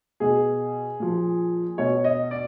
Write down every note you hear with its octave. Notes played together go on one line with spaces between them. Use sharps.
B2 G#4
A#2 F3
B2 C#5
D#5
D5